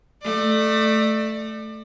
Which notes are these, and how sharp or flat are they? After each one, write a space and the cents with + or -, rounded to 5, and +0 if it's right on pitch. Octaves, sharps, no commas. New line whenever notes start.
A3 +0 D5 +30